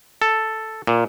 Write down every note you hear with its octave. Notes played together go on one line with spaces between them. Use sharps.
A4
A#2